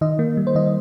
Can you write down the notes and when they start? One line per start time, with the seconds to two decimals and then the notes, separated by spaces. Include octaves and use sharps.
0.01 D#3 D#5
0.19 A#3
0.37 G3
0.47 C5
0.55 D#3 D#5